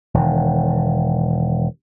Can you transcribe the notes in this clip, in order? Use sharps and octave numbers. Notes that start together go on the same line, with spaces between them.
E1 D#3